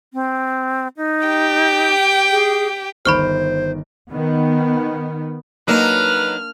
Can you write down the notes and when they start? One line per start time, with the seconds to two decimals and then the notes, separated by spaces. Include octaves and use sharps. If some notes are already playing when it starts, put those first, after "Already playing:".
0.14 C4
0.97 D#4
1.27 G4 G5
2.32 G#4
3.05 G1 D#3 C5 B5 C#6 F6 D7
4.09 D#3 B3
5.68 F#3 A#3 D4 D#4 F#4 B4 F6